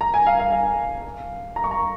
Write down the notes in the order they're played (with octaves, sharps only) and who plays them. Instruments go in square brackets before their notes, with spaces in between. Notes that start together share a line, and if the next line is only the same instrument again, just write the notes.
[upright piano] A#5
G#5
F5
F5
F5
A#5
C#6
A#5